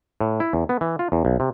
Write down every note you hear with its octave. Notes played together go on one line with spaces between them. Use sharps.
A2
E4
E2
B3
E3
F4
E2
B1
C3